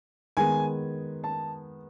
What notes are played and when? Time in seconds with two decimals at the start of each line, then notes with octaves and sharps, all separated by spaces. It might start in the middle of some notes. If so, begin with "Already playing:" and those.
0.37 D#3 G#3 B3 G#5
1.24 A5